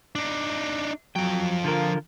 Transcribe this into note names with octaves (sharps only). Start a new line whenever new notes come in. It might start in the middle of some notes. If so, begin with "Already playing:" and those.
D4 D#4
F3 F#3 G5
D3 F4 A#4